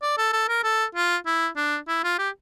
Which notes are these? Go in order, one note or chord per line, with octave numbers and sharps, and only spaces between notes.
D5
A4
A4
A#4
A4
F4
E4
D4
E4
F4
G4